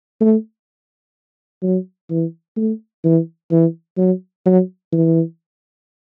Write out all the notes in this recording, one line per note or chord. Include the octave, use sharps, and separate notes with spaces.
A3
F#3
E3
A3
E3
E3
F#3
F#3
E3